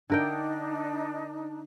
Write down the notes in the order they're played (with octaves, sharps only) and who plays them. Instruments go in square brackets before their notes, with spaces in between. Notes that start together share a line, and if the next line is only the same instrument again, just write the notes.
[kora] D3 A#4 G5 [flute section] D4 D#4